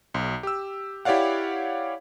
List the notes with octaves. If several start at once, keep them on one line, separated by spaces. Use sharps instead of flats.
B1
G4 E6
E4 G4 C#5 D5 F5 F#5